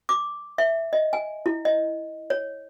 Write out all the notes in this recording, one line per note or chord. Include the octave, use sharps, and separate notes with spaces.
D6
E5
D#5
G#5
E4
D#5
C#5